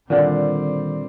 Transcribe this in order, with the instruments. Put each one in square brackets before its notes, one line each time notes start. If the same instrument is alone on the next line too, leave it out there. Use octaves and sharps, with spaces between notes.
[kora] A#2 D3 D5 [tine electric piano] D#3 [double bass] G3 C4